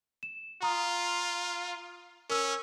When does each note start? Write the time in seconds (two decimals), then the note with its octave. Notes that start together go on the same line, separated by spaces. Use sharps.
0.23 E7
0.63 F4 A#5 D#6
2.30 C#4 A#4 E6